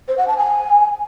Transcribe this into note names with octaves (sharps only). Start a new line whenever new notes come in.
C5
F#5
A5
G#5